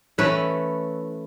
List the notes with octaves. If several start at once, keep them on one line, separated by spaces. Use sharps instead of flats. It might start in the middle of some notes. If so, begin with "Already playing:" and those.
E3 A3 C#4 E4 B4